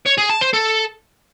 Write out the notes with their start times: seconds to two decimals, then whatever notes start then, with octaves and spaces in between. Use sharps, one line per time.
0.06 C#5
0.18 G#4
0.30 A5
0.42 C5
0.54 A4